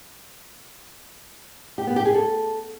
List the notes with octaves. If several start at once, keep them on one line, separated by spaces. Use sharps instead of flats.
G4
B3
G4
G#4
A4